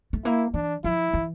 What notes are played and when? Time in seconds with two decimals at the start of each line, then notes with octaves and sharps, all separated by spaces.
0.13 A3
0.24 A#3 E4
0.54 E3 D4
0.84 F3 E4
1.13 E3